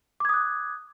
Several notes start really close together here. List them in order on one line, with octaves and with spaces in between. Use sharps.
D6 G#6 D#6 F#6